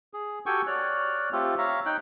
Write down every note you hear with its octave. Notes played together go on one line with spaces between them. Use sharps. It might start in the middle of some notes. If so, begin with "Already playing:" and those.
G#4
F#4 G4 A4 G5 G#5 C#6
C#5 D5 F6 F#6
A3 C4 F4 G4 A4
C#5 E5 F5 A#5
D#4 G5 F#6